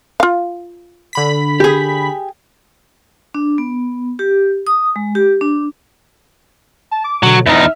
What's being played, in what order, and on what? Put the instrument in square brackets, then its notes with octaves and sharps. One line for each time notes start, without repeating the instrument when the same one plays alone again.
[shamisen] F4 F5
[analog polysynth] D3 B5 B6
[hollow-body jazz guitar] G4 G#4
[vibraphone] D4
B3
G4
D#6
G#3
G4
D4
[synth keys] A5
D6
[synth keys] B2 D3 [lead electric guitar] F#3
[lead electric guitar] E2 D#4 [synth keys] E5 F6